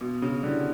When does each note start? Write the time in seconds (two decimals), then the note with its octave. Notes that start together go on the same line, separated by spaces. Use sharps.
0.01 B2 B3
0.22 C#3
0.43 D3 E4 G4 D5